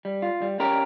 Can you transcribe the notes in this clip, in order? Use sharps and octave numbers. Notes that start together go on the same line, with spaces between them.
G3
F4
G3
C#4 G4 A#4